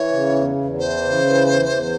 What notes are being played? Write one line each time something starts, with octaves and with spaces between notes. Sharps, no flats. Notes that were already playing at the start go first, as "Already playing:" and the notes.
Already playing: E3 C#5
C#3
E2
E2
E3 C5
C#3
E3
E2
E2